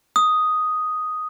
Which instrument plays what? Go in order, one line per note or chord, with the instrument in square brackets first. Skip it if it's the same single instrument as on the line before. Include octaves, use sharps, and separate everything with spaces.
[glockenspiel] D#6